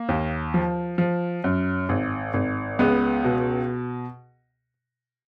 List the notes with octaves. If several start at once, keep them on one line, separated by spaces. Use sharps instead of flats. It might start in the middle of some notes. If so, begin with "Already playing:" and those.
Already playing: A#3
D#2
F3
F3
F#2
G#1
G#1
C#2 G#3 B3
B2